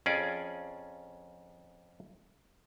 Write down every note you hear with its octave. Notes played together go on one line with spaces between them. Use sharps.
F2 C#4 F4 G#4 D5